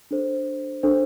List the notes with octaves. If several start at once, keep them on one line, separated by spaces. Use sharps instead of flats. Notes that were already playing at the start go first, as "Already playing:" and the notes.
D4 A4 C5
D4 A4 C5